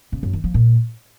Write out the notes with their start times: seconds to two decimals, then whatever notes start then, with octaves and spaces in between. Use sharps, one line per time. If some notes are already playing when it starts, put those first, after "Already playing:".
0.12 C#3
0.23 F#2
0.33 D#3
0.44 F3
0.54 A#2